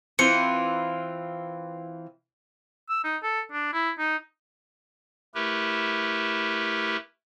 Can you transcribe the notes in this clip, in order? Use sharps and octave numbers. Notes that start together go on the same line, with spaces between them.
E3 C4 F4 C#7
E6
D#4
A4
D4
E4
D#4
A3 E4 G4 A#4 B4